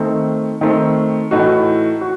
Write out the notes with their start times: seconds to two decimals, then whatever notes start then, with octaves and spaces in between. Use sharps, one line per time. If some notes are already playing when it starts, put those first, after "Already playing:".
Already playing: D#3 A3 C4
0.61 D#3 A3 C4
1.31 A2 E3 A3 D#4 F#4
2.01 F#4